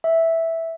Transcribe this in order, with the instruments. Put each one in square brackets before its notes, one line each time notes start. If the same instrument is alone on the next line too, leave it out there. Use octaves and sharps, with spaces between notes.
[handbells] E5